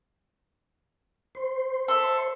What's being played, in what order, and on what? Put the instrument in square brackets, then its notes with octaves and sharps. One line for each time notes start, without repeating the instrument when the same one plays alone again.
[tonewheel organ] C5
[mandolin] A4 E5